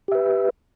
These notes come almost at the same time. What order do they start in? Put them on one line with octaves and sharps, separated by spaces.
G4 E5 B4